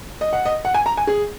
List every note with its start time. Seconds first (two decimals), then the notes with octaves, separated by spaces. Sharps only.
0.21 D#5
0.33 F#5
0.46 D#5
0.65 F#5
0.74 G#5
0.86 A#5
0.97 G#5
1.07 G#4